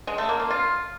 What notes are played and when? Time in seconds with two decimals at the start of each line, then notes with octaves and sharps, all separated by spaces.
0.07 G#3
0.18 A3
0.29 A#3
0.40 F4
0.50 F4